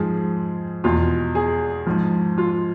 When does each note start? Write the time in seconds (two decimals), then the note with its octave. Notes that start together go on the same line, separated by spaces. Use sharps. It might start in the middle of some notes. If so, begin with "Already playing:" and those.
Already playing: G#2 F3 G#4
0.84 E2 B2 F4
1.35 G#4
1.87 G#2 F3
2.38 F4